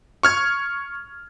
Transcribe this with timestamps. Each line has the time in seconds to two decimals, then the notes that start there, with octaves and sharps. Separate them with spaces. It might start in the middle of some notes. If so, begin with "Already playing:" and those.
0.23 C#6 F6 G#6